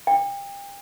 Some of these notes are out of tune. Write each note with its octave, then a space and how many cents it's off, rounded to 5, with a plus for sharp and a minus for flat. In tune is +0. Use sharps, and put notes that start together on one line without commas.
G5 +35